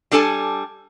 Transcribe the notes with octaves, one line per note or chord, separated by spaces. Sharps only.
G3 D4 A4 G#5 A5